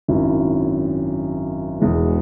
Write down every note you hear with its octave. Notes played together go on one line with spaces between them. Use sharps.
G#1 F#2 F#3 E4
E1 E2 B2 G#3